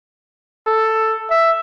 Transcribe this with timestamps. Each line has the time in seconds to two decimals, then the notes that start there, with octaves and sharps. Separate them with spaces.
0.67 A4
1.30 E5